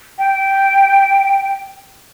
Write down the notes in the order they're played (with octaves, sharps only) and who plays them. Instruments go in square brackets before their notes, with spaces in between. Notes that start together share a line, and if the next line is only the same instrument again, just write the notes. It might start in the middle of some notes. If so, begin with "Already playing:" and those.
[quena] G5